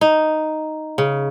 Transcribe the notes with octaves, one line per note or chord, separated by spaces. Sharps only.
D#4
C#3